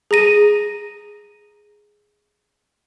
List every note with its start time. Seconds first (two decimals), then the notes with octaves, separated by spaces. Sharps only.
0.11 G#4 A#5 A#6 D#7